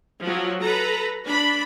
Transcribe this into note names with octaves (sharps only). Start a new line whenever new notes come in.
F3 F#3
A4 B4 A#5
D4 B5